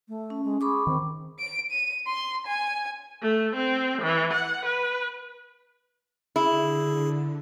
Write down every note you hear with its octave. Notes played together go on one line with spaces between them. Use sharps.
A3
C#4
G#3
G#4 B5 C#6 D6
D#3 C4
D7
D#7
C6
G#5
A3
C4
E3
F#5
B4
D3 E4 G#4